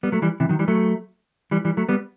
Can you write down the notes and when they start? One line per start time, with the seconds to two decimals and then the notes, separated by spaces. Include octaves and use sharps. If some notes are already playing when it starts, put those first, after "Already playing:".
0.03 G3 B3
0.12 F#3 A3
0.22 E3 G3
0.40 C3 E3
0.49 D#3 F#3
0.59 E3 G3
0.68 F#3 A3
1.51 E3 G3
1.65 E3 G3
1.77 F#3 A3
1.89 G3 B3